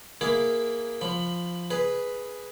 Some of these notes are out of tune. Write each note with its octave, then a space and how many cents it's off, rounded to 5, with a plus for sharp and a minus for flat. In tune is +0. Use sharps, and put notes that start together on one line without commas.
A#3 +0 E4 +0 G#4 +0
F3 +0 B5 +15
G#4 +0 B4 +0